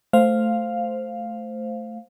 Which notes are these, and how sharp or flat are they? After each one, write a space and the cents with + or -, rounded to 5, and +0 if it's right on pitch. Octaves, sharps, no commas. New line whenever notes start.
A3 +0 C5 +0 F5 +0